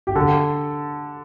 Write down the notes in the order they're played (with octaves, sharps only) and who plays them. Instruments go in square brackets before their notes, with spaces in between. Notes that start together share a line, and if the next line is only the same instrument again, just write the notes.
[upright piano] G4
[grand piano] D3 [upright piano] A4